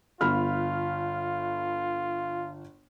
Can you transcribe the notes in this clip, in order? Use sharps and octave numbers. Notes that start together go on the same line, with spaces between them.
G1 F4 B5 F6